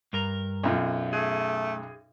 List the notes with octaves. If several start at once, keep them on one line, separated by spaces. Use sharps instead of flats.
G2 A#4 A#5
B1 F#2 F4
A3 G#4